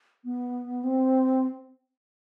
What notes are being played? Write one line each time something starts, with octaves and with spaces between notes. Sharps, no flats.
B3
C4